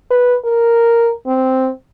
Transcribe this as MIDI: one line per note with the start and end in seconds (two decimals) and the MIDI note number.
0.10 0.36 71
0.45 1.11 70
1.26 1.69 60